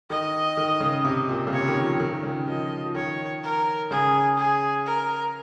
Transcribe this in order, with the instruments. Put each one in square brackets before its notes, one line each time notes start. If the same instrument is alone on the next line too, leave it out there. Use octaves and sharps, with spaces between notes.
[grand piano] D#3 [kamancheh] D#5
[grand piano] D#3
C#3
C3
A#2
C#3
[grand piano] C3 [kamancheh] C#5
[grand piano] D#3
F3
D#3
C#3
[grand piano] F3 [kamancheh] D#5
[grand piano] F3
[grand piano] D#3 [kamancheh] C#5
[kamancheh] A#4
[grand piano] C#3 [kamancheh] G#4
[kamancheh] G#4
A#4